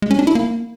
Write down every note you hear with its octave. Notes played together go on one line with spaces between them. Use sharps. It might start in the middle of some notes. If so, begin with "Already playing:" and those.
G#3
C#4
D4
E4
A#3